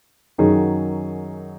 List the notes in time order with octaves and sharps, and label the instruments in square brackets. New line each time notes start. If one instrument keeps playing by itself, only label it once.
[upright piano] F#2 D#3 F#3 D#4 G#4